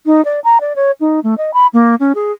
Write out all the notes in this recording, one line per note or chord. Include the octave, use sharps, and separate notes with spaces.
D#4
D5
A#5
D5
C#5
D#4
A3
D#5
B5
A#3
C#4
G#4